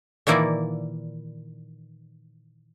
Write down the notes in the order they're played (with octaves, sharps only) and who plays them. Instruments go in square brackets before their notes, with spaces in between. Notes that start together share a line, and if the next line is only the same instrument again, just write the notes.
[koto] A#2 D#3 E3 A#3 E4 D5